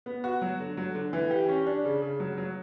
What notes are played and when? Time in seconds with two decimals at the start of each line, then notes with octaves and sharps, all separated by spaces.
0.06 B3
0.24 F#4
0.42 F#3
0.60 D3
0.77 F#3
0.95 D3
1.13 E3
1.31 G4
1.49 C#4
1.67 D4
1.85 C#3
2.02 C#3
2.20 F#3
2.38 F#3